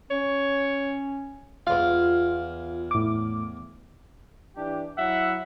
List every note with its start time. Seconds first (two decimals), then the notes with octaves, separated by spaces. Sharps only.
0.10 C#4 C#5
1.67 E2 F4 F5
2.91 A2 D6
4.56 E3 D4 G4
4.98 F#3 E4 E5 F#5